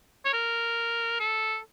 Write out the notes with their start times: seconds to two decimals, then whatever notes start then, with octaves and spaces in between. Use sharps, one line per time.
0.25 C#5
0.33 A#4
1.20 A4